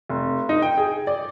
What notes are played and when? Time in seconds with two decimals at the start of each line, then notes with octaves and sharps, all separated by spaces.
0.10 F1
0.49 D#4
0.62 G5
0.78 G#4
1.07 D5